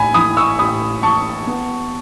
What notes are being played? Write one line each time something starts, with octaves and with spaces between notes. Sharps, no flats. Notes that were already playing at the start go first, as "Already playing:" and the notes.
Already playing: A1 G#5 B5
E3 B5 D#6
C#6 E6
A1 B5 D#6
E3 A5 C#6
B3